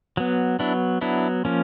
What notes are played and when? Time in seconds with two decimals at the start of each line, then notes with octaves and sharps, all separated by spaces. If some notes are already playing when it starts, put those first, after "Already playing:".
0.17 F#3 B3
0.59 F#3 B3 D4 E4
1.01 F#3 B3 D4 E4
1.45 F3 A#3 C#4